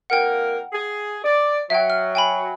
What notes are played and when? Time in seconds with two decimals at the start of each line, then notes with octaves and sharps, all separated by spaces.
0.10 F2 A#3 A#4 F#5 G5
0.73 G#4
1.24 D5
1.70 F#3 E5 G5
1.90 F6
2.15 G5 G#5 B5